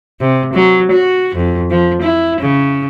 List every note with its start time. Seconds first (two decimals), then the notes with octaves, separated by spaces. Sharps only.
0.20 C3
0.54 F#3
0.92 F#4
1.36 F2
1.71 F3
2.02 E4
2.41 C#3